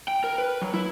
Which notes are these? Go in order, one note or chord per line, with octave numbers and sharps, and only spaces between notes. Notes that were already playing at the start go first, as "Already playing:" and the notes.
G5
A#4
B4
F#3
E4